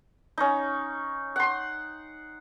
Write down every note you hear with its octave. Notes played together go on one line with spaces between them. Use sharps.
C#4 D#4
F#5 C6